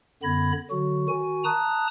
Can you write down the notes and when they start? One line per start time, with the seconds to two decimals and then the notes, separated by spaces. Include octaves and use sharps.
0.23 F#2 D3 B3 B5 G#6 A#6
0.70 D3 F#3 F#4
1.08 D#3 F#4 G#5
1.44 A5 A#5 D#6 F#6